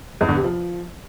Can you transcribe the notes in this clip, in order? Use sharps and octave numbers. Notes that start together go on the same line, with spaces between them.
E2
D3
C3
F3